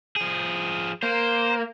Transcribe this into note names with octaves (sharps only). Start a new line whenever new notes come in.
F3 G#4
A#3 C5